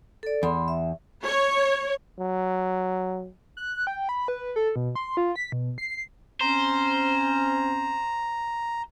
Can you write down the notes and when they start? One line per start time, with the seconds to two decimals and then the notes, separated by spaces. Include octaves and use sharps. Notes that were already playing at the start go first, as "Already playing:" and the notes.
0.23 A4 D5
0.43 E2 B5 C6
0.68 E5
1.27 C#5
2.19 F#3
3.57 F#6
3.87 G5
4.09 B5
4.28 B4
4.56 A4
4.76 B2
4.96 C6
5.17 F4
5.36 B6
5.52 B2
5.78 C7
6.41 C4 C#4 C5 A#5